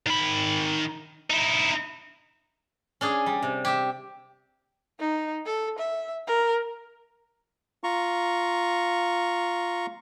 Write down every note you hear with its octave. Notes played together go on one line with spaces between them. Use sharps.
D#3 B5
D#4 E4
C#4 D4 G#4
G3
C3
G4 E5
D#4
A4
E5
A#4
F4 A#5 C#6